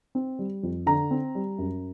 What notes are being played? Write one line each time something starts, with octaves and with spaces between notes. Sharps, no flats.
C4
G3
F2
D3 A#5
C4
G3
F#2